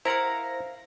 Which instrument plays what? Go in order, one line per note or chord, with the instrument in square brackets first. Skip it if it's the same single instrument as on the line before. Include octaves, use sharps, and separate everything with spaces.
[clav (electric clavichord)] E4 A#4 F#5 [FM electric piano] C5 A#6 [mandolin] F5 A#5